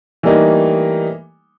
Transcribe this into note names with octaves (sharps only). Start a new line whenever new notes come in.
E3 G3 A3 A#3 D#4